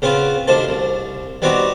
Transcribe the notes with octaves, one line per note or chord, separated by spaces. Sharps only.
C#3 B3 C4 F4
D2 C3 D#3 C5 A5
C2
G3 B3 C4 D#4 F#4 G4